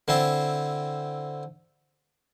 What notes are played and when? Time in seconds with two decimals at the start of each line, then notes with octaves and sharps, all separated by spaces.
0.08 D3 C4 E4 C5 A5